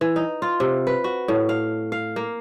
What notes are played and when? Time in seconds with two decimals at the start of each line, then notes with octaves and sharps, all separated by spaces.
0.01 E3
0.16 D#4
0.42 F4
0.60 C3
0.87 B4
1.04 F#4
1.28 A2
1.49 F5
1.92 F5
2.16 A#3